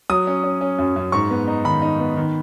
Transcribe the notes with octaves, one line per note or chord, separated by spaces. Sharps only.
F#3 D#6
C#4
C#4
C#4
F#2
F#2
G#2 C#6
B3
D#4
D#3 B5
D#4
B3
D#3